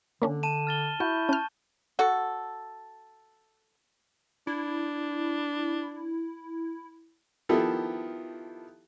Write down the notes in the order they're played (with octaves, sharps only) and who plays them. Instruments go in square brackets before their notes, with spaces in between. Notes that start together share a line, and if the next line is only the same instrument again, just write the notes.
[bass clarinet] D3 [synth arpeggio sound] A#3 C#4 D4
[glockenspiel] A5 D#7 E7
F6 A6 G7
[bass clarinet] E4 [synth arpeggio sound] F#4 [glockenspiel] C#6 G6
[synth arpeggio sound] C#4 F6 [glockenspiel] A5
[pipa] F#4 A4
[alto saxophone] D4 [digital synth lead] E4
[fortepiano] D#3 F3 B3 E4 G4 A4